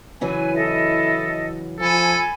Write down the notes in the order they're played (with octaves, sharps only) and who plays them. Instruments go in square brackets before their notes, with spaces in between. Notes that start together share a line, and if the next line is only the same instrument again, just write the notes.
[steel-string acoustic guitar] C#3 E3 F#3 [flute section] B4 G#5
[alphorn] E4 [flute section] A4 D#5
[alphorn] F3 [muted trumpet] A4 [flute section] G#5 B5